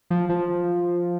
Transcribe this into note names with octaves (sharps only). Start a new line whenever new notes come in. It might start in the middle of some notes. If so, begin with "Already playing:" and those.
F3
F3